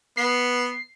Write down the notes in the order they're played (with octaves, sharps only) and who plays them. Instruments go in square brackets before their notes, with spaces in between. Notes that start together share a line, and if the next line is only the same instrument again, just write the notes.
[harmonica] B3 [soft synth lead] C7